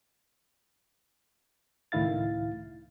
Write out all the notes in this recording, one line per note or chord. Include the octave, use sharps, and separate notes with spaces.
C#2 A2 D#3 E4 F5 A6